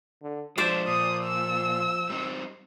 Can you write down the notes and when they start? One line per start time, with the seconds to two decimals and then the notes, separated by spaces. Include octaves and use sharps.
0.23 D3
0.58 F3 G#3 D4 C5 D5 E5
0.87 A#2 D#6
1.24 E6
2.10 G3 C4 D#4